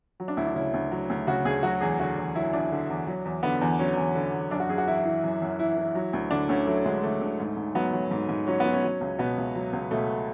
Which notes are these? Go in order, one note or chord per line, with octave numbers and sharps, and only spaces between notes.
F#3
D4
D2 E4
D4
C#3 E4
D2
F#3
D2
C#3 F#4
D2 G#4
F#3 F#4
E2 G#4
D3 F#4
E2
F#3 E4
E2 D4
D3
E2
F#3
E2
D3 B3
E2
F#3 C#4
E2
D3
E2
F#2 D4
F#4
F#2 G#4
F#4
E3 E4
E3
F#2
F#2
E3 E4
E3
F#3
D2
D3 D4
D2 C#4
F#3 A3
D2 G#3
D3 A3
D2
G#2
G#2
F#3 B3
F#3
G#2
G#2
F#3 C#4
F#3 B3
C#4
F#3
C#2
B2 B3
C#2
F#3
C#2
B2 A3